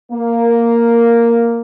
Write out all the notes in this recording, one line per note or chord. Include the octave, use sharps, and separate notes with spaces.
A#3